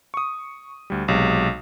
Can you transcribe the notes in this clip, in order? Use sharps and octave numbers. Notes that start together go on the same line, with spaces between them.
C#6 D#6
D2 G3
B1 C3 G#3